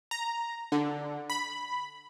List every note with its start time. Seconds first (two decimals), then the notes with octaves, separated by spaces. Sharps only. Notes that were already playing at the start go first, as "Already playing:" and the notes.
0.11 A#5
0.72 D3
1.30 B5